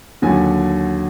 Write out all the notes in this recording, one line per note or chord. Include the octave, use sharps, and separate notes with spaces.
D#2 D3 F#3 G#5